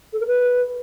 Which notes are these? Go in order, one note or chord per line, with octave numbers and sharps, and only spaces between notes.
A4
A#4
B4